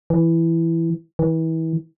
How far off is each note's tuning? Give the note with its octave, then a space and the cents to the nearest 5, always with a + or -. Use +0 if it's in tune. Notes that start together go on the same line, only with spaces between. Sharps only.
E3 +5
E3 -30